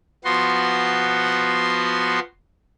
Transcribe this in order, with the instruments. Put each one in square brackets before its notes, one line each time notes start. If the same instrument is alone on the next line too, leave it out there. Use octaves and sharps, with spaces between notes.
[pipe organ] F3 B3 F#4 C6